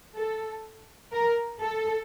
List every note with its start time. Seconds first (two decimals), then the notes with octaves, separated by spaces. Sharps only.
0.16 A4
1.13 A#4
1.60 A4